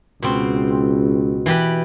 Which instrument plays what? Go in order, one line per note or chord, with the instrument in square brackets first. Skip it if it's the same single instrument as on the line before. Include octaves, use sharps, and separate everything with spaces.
[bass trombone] C#2 [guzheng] B2 C4
[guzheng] E3 G4 B4